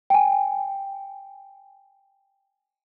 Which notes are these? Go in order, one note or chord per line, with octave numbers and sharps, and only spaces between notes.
G5 G#5